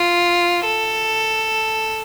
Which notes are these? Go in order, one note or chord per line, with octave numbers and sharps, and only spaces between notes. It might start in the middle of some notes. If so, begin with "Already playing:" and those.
Already playing: F4
A4